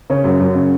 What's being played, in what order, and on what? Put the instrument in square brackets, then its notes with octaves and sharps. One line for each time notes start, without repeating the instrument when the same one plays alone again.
[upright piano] C#3 C#4
F#2
F#2
C#3